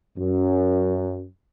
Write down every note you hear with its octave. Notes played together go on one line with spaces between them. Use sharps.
F#2